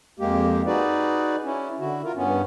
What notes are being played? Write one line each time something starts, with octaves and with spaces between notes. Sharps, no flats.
F2 G#3 A#3 G4
D#4 F#4 G#4 B4 D5
C#4 E4
D3 E4 F#4
F4 A#4
G2 B3 C#4